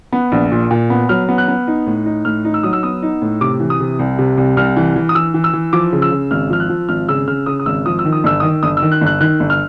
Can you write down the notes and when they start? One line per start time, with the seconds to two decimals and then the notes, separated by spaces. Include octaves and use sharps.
0.12 B3
0.32 A#1
0.52 A#2
0.71 A#2
0.90 B3
1.09 F#3 F6
1.29 B3
1.38 F#6
1.48 B3
1.67 D#4
1.86 A2
2.06 D#4
2.25 A2 F6
2.45 D#4
2.54 E6
2.63 F#3 D#6
2.73 E6
2.83 B3 D#6
3.03 D#4
3.22 A2
3.41 C3 D6
3.60 E3
3.70 D#6
3.80 C3
3.99 C2
4.19 C3
4.37 C2
4.57 C2 F6
4.77 E3
4.96 E3
5.09 D#6
5.15 E3 E6
5.34 E3
5.44 E6
5.53 E3
5.73 F3 D6
5.92 C#3
6.02 E6
6.11 C#3
6.31 G#1 F6
6.50 F3 F6
6.60 F#6
6.69 F3
6.89 G#1 F6
7.08 C#3 E6
7.27 C#3 F6
7.46 C#3 D#6
7.60 D#6
7.66 G#1 E6
7.86 F3 D#6
7.99 E6
8.05 D#3
8.13 D#6
8.24 G1 E6
8.40 D#6
8.43 D#3
8.63 G1 D#6
8.77 E6
8.82 D#3
8.92 F#6
9.01 G1
9.06 F#6
9.21 D#3 F#6
9.40 G1
9.50 F6